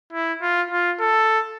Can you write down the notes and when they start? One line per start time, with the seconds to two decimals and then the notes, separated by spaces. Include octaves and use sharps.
0.13 E4
0.42 F4
0.71 F4
1.00 A4